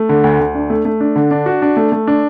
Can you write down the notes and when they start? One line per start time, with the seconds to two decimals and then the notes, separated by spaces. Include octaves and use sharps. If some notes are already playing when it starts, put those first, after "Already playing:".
Already playing: A3
0.09 D3
0.24 D2
0.40 D2
0.55 D4
0.70 A3
0.85 A3
1.00 D4
1.16 D3
1.31 D4
1.46 F#4
1.62 D4
1.77 A3
1.92 A3
2.07 D4